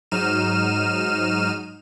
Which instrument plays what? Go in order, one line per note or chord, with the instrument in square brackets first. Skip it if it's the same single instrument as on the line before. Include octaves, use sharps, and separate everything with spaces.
[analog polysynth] G#2 F#3 D#4 F6 D#7 E7